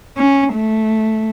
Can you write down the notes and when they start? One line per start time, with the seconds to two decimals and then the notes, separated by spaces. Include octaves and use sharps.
0.17 C#4
0.54 A3